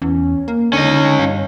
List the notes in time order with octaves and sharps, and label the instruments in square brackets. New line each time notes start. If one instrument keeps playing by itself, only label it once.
[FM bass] E2 [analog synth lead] C#4
[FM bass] A#3
[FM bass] D3 [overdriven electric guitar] C#4 D#5 [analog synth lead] D#4
[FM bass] G2 [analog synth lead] F5